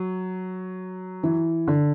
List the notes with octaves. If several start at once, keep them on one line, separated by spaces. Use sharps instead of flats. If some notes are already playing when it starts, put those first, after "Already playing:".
Already playing: F#3
E3
D3